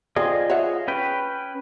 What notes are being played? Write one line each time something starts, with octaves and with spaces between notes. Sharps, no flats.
D3 C4 F4 G#4 D#5
C#5 E5 F#5
C#4 B4 G5